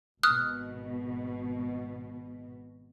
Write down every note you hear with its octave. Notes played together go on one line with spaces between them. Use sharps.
G#1 B2 D#6 F6 F#6